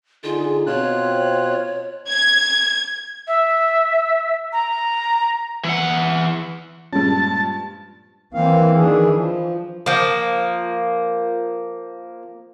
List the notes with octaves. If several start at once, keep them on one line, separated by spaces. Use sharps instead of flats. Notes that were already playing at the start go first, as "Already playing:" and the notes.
D3 D#4 F4 G#4
B2 C4 F4 C#5 F#6
G#6
E5
A#5
E3 F#5
G2 A#2 F3 G#3 C#4 A5
E3 A#3 C4 F5
D#3 D4 G#4
F3
F3 A#3